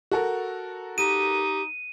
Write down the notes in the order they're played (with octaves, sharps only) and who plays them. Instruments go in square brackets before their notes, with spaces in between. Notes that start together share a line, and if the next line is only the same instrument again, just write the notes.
[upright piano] F#4 A4 A#4
[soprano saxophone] D#4 [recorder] G4 [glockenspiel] D#7